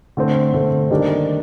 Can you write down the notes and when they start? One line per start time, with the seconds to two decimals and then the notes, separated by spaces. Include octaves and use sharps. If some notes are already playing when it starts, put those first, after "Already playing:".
0.17 D3 A3 C4
0.54 D3 A3 C4
0.90 D#3 G3 A#3 D4